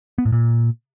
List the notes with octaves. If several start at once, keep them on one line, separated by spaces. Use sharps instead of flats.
B3
A2
A#2